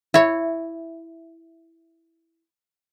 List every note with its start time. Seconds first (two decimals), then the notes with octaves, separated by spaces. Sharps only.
0.14 E4 C#5 E5